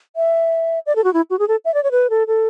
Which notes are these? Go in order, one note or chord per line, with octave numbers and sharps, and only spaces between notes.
E5
D5
A4
F#4
E4
F#4
G#4
A4
E5
D5
C#5
B4
A4
A4